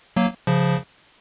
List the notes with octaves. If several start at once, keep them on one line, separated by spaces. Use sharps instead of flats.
F#3 A#3
C#3 F3